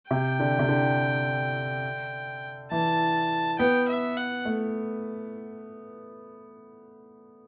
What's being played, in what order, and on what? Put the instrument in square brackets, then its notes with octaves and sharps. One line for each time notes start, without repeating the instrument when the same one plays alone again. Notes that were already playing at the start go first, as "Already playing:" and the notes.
[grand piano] C3 [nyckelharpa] G5
[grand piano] D3
C3
D3
[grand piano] E3 [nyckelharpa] A5
[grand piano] B3 [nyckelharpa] G5
[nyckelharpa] E5
F#5
[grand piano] A3